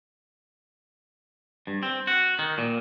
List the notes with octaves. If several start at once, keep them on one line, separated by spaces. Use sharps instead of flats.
G2
C4
F#4
D#3
A#2